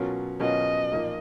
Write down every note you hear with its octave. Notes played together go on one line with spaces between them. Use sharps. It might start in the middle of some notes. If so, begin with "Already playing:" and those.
Already playing: B2 F#3 C#4 F4 A#4
B2 F#3 C#4 F4 A#4 D#5
A#2 F3 A#3 D#4